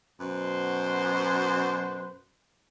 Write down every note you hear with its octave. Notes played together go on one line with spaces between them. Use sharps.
F#2 B2 B4 C5